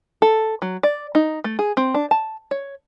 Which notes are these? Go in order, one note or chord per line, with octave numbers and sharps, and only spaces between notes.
A4
F#3
D5
D#4
A3
G#4
C4
D4
A5
C#5